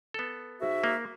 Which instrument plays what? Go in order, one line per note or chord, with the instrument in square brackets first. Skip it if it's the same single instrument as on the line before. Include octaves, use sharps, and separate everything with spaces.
[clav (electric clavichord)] B3 A4
[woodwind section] G#2 F#4 E5
[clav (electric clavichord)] A#3